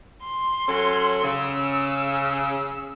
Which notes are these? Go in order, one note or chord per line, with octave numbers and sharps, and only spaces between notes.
C6
F#3 C#4 A4
C#3 E6